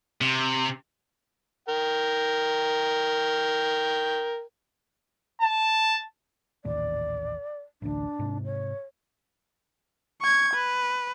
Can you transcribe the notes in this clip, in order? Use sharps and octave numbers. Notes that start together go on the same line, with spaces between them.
C3
A#4 G5
A5
A1 D#2 A#2 D5
A1 D2 D4
G#2 C3
C#5
C#6 G#6
B4